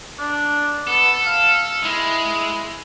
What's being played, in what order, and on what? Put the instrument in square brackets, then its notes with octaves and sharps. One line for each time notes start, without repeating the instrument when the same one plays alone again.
[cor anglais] D4
[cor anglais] B3 [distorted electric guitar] A4
[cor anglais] F5
[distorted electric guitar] G#3 [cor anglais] E4